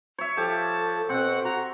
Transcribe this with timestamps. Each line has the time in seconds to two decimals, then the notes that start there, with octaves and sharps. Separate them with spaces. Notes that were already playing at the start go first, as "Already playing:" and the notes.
0.19 C#5 E5
0.37 F3 G4 A4 A5
1.09 B2 C4 F#5
1.45 F#4 A#5